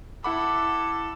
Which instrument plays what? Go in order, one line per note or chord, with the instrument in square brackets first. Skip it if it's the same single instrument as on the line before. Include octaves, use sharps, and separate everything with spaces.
[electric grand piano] E4 F#5 B5 [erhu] A4 [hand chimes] D6